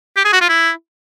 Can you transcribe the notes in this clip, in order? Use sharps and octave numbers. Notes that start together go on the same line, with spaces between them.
G4
G#4
F#4
F4
E4